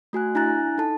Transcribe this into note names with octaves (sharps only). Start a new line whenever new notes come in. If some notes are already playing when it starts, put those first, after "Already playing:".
A3 F#4 G#5 F#6
D4 E4 G#5 A#5 F#6 A6
D#4 A4 A5